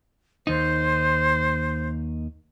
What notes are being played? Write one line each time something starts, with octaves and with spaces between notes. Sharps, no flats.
D#2 D#4 C5